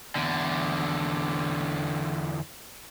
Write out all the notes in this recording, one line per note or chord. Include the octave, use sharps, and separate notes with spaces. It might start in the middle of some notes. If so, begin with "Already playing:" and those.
E2 D3